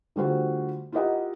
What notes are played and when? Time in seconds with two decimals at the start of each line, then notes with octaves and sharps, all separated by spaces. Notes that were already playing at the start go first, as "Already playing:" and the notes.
0.16 D3 G3 A3 F4 F#4 C5
0.92 E4 F4 G4 A#4 D#5 F#5